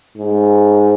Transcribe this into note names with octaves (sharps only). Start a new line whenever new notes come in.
G#2